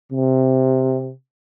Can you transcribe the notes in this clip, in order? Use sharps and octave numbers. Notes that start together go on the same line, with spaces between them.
C3